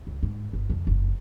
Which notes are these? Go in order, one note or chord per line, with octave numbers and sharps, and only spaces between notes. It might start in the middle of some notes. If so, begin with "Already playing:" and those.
C#2
G#2
G1
F2 C#3
F#1 F2